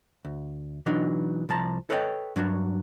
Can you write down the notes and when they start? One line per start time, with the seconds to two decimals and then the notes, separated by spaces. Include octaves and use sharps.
0.25 D2
0.86 B2 E3 F#3 D4 D#4
1.49 C2 F3 A5 A#5
1.90 A4 B4 C#5 D#5 F5 G5
2.36 G2 F#3 D4 F#4